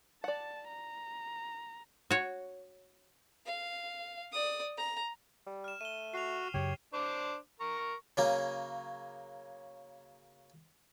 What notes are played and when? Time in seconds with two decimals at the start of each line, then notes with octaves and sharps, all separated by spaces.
0.24 D5 F#5 A5
0.68 A#5
2.11 F#4 C#5
3.46 F5
4.33 D5 D#6
4.78 A#5
5.46 G3
5.64 F6 E7
5.81 A3 D#7 E7 G7
6.14 F#4 C7 F7
6.54 F#2 C#3 G4 C#5
6.94 D4 C5 D6
7.60 A#4 A#5 C#6
8.17 C#3 F#3 A#3 C#4